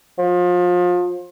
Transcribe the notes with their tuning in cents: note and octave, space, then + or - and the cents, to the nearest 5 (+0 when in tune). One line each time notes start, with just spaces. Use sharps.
F3 +30